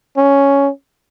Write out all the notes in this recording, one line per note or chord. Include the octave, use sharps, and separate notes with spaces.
C#4